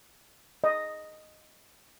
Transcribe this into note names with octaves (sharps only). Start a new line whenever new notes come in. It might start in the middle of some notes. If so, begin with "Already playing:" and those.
D#5